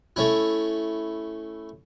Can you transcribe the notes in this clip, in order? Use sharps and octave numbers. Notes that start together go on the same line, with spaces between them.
A3 C#4 E4